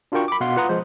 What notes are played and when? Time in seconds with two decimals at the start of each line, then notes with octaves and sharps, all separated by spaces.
0.12 D4 F4 F#4 A#4 G5 C#6
0.28 B5 D6
0.41 B2 F5 F#5 C6
0.56 F4 B4 F#5 A#5 C6 D#6
0.69 F3 G#3 C5